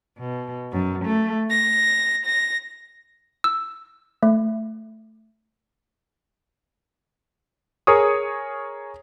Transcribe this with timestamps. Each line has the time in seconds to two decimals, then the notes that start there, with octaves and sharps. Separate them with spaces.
0.20 B2
0.73 F#2
1.05 A3
1.49 A#6
2.24 A#6
3.44 E6
4.23 A3
7.87 G#4 A#4 C#5 C#6 D#6